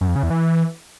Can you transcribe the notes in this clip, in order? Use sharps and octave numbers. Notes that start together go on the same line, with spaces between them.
F#2
F2
C#3
E2
E3